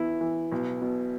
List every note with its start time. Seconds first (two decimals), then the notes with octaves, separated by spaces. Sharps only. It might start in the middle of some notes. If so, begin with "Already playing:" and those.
Already playing: E2 E3 E4
0.21 E3
0.52 B1
0.82 B2